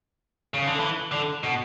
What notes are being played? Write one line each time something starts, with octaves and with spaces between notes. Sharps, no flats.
C#3
D3
E3
D3
B2